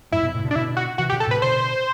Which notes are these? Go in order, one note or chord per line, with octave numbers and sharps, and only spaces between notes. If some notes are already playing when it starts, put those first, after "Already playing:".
F#2 A2 E4
G2 B2
A2 C3
B2 D3
D4
B2 D3 E4
F#4
C3 E3 F#4
G4
B2 D3
A4
A2 C3 B4
B2 D3 C5